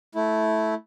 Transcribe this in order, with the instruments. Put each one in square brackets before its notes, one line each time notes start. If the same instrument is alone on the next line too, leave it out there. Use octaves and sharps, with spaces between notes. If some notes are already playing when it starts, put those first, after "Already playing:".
[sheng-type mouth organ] A3 E4